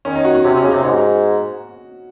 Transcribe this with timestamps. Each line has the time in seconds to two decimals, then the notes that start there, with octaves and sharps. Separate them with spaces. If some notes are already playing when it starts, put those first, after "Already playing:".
0.05 D#3 C#4
0.15 D#4
0.25 F#4
0.35 F#4
0.44 C3 C#4
0.54 C3
0.57 C#4
0.64 C#3
0.71 C3 D#4
0.84 G#2 F#4